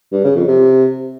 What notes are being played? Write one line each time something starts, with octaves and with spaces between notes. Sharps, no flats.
G2
C#3
F2
C3